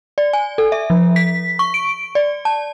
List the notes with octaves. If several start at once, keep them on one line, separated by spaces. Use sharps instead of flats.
D5
G#5
A4
E5
F3
B6
C#6
D7
D5
A5